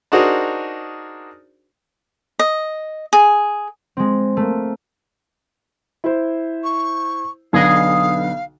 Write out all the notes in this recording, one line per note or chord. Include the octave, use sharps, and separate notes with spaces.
D4 D#4 F#4 G#4 A#4 C5
D#5
G#4
G#3 C4
A3 A#3
E4 C5
C#6
B1 D3 B3 G#4 D#5 F5